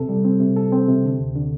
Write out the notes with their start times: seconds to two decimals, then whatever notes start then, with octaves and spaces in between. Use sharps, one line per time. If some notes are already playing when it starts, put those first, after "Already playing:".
Already playing: C3 A4
0.09 G3
0.24 C4
0.40 C3
0.56 A4
0.72 C4
0.88 C3
1.04 D3
1.20 D2
1.36 D3